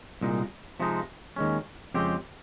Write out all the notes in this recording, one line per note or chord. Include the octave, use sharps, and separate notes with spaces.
C2 A#2 G#3 D#4
C3 F3 G#3 D#4
D#2 D#3 G#3 C#4
F2 C#3 G#3 C4 G4